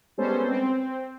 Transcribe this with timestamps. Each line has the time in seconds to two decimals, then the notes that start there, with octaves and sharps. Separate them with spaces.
0.18 G3 G#3 B3 C#4 A4 C5
0.48 C4